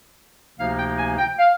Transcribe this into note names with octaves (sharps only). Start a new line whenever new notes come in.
D2 C3 F3 A#3 D#4 F5
G5
G#5
G5
F5